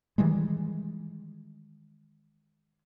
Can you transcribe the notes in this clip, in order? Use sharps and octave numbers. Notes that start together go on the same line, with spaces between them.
D#3 E3 G3 G#3